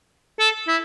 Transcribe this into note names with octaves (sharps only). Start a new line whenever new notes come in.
A4
E4